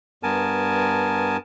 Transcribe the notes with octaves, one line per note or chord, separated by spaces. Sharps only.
G2 B3 A#4 G#5 A5